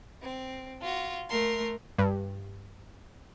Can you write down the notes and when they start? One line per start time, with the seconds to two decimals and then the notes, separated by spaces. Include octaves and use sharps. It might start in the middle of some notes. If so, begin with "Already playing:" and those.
0.22 C4
0.82 F4 F#4
1.29 A3 A#4 C6
1.98 G2